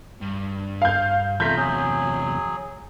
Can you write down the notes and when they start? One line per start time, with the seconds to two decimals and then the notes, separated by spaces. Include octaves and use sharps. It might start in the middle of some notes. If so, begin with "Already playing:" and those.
0.21 G2
0.82 F5 G6
1.40 E2 C3 A3 F4 A#5 G6 B6
1.57 F#3 G#4